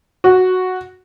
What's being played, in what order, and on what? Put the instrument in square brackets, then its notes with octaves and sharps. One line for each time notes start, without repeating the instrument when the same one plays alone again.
[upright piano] F#4